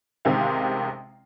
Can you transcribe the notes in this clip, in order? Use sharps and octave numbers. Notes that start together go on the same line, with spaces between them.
A1 C3 D#3 G#3 C5 F5